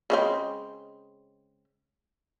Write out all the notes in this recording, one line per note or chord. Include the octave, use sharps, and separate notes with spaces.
C#3 G#3 C4